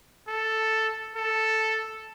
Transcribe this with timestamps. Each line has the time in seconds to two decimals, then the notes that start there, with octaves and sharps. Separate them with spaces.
0.28 A4
1.16 A4